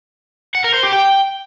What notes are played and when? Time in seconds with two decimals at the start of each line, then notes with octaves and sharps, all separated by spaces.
0.55 F#5
0.64 A#4
0.74 C5
0.83 G4
0.93 G5